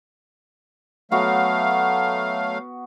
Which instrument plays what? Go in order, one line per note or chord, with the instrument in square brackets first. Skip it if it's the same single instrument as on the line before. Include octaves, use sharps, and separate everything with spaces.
[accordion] F#3 A3 F5 [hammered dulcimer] B3 F#4